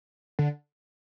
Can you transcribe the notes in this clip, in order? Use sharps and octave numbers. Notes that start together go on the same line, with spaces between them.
D3